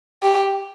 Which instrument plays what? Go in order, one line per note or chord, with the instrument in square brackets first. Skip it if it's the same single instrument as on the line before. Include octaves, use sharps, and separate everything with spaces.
[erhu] G4